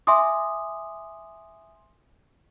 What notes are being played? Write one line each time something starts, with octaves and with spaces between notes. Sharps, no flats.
E5 G#5 C6 D6 D#6